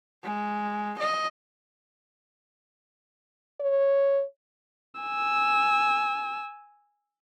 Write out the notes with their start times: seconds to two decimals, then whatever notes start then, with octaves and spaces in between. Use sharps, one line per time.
0.23 G#3
0.98 D#5
3.60 C#5
5.01 G#5 E6